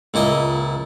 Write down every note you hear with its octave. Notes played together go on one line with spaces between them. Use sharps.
C#2 A#2 E4 D#5